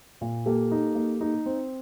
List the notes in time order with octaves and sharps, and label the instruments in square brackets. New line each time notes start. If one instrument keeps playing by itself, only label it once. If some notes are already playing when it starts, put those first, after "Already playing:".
[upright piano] A#2
[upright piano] A#3 [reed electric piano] G4 A4
[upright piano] D#4
A#3
D#4
C4